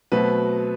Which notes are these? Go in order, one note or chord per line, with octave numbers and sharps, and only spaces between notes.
B2 F#3 A3 C4 B4